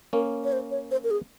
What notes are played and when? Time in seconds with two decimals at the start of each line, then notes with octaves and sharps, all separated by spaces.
0.13 A#3 C#4 A#4
0.44 C#5
0.52 C5
0.71 C#5
0.91 C5
1.04 A#4
1.11 G#4